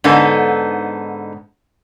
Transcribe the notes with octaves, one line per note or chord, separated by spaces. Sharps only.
G#2 D3 B3 D#4 A4